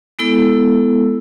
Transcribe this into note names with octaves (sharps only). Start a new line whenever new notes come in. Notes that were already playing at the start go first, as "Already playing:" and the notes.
G#3 B3 E4 A4 E6